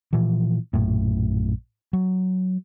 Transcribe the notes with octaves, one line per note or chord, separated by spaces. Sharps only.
A#2 E3 F3
A#1 F#2 A2
F#3